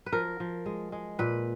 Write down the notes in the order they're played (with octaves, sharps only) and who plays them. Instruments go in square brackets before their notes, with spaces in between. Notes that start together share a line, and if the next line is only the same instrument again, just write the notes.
[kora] B4
F3 A#4
F3
G#3
G#3
A#2 B4